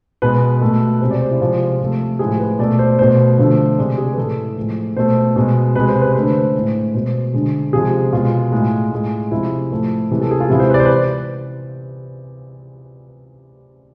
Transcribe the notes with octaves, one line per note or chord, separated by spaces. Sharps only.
B2 G#3 B4
B2 A3
C3 G#3 C5
D5
C5
E4
C3 F3 G#3 F4
C3 F3 A3
A2 F3 G#3 G#4
B4
B2 A3 D5
C5
B2 A3 C5
D3 F3 A3
C3 G#3 D5
G#4
B4
A2 E3 A3 A4
A2 F3 G#3
B2 A3 C5
B2 G#3
C3 G#3 B4
C5
B4
D3 A3 B4 C5
C5
A2 G#3
B2 G#3 C5
D3 G#3
C3 F3 G#3 G#4
B2 G#3 F4
A2 G#3
A2 G#3
C3 F3 G#3 E4
A2 F3 A3
C3 E3 G#3
A4
G#4
F4
C3 E3 G#3 E4
C5
B4
D5
C5
B4